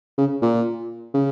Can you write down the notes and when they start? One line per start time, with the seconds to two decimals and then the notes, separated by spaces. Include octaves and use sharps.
0.18 C#3
0.42 A#2
1.14 C#3